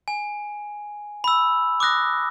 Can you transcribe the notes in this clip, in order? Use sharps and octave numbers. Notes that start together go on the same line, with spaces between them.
G#5
B5 E6
D6 D#6 F#6 A#6